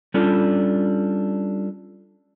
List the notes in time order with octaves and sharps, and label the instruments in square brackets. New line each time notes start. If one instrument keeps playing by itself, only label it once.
[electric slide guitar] G3 C#4 D4 F4 A4